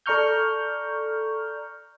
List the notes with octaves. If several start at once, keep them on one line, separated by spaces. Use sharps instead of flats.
A4 D5 A#5 C#6 F6 G6